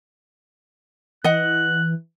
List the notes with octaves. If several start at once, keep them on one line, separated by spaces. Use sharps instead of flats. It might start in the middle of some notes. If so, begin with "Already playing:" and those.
E3 D#5 F#5 F#6